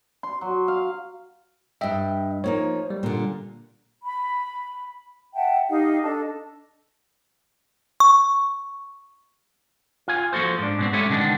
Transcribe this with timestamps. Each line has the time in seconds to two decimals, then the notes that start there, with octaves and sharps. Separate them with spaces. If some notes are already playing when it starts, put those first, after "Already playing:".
0.23 C6
0.41 F#3
0.68 F5
1.81 G2 D#5 E5 G5
2.44 F3 A#3 D#4 C#5
2.90 G3
3.03 A#2 D3
4.05 B5
5.34 E5 F#5 G5 A5
5.69 D#4 G4 D#5 F5
6.03 D4 A4 D#5 A5
8.00 C#6
10.08 F4 G#5
10.33 F3 A#3 F#4 A4 C5
10.59 G#2 D4
10.79 G#2 B2 C4
10.93 G#3 A3 C#4 E4 G4 A4
11.10 B2 D3 D#3 G#3 D4